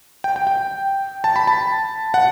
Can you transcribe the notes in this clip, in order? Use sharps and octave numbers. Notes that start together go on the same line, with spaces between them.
G5
G5
G5
A5
B5
A5
F#5